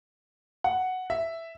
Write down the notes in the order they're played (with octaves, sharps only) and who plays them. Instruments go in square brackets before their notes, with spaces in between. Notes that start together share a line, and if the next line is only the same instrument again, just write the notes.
[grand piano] F#5
E5